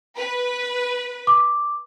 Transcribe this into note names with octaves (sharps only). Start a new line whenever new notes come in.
B4
D6